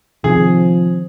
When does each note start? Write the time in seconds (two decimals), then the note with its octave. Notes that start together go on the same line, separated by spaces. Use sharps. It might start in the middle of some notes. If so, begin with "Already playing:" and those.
0.24 C3 D#3 F3 G#4